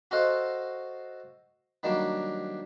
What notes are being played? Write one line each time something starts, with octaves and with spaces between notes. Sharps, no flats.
F#4 A4 C5 D#5 F5 F#5
D#3 F#3 G3 A#3 D4